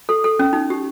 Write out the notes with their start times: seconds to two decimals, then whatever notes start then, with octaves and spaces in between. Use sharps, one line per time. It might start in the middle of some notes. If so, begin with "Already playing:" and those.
0.09 A4
0.24 A4
0.39 C#4
0.53 D#4
0.70 G4